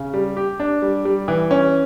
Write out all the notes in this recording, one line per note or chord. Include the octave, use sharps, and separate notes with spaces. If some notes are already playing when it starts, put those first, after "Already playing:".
Already playing: C#3
G3
G4
D4
G3
G3
E3
C#4